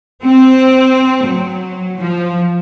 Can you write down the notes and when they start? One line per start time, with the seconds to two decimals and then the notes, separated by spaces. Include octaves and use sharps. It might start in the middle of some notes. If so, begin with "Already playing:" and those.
0.25 C4
1.26 F#3
1.99 F3